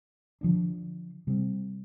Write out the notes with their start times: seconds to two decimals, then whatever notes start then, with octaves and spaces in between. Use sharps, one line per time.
0.41 D3 F3 A#3 D4
1.27 C3 G3 C4